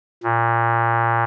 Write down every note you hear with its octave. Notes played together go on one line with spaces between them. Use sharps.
A#2